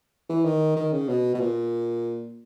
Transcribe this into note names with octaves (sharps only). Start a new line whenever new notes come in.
E3
D#3
D#3
C#3
B2
B2
A#2